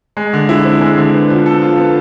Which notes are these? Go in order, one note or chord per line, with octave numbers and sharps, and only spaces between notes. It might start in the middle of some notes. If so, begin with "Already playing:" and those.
G#3
D3
E4
C4
G#3
D3
B3
F3
A4
F4
B3